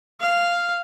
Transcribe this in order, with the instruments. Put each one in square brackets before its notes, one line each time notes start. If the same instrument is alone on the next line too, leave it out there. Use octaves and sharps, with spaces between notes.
[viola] F5